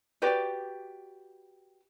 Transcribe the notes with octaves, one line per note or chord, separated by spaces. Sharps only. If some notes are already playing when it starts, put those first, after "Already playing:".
F#4 G4 B4 D5